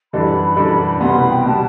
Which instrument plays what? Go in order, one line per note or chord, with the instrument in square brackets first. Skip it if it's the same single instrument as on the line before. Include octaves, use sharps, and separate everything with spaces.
[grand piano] F#2 E3 G3 D4 A4 [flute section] B5
[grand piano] F#2 E3 G3 D4 A4
[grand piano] C2 B2 G3 B3 [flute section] C6
[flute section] B5
F#5
G5
[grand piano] B2 G3 B3 [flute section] A5